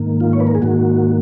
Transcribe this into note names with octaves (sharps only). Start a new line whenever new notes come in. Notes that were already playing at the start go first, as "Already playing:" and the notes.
Already playing: G#2 D#3 A#3
F4
C#5
B4
A#4
G#4
G#2 D#3 A#3 F#4